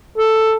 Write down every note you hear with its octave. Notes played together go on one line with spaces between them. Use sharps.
A4